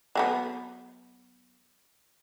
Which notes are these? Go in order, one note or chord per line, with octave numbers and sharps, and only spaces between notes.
F#3 A3 B3